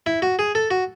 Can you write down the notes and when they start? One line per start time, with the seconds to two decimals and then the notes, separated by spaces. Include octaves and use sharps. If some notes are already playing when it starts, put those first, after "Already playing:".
0.06 E4
0.22 F#4
0.39 G#4
0.55 A4
0.71 F#4